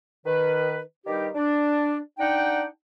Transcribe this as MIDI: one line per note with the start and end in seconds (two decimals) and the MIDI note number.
0.25 0.79 51
0.25 0.79 71
1.06 1.28 43
1.06 1.28 51
1.06 1.28 55
1.06 1.28 63
1.06 1.28 67
1.35 1.98 62
2.19 2.63 62
2.19 2.63 63
2.19 2.63 78
2.19 2.63 79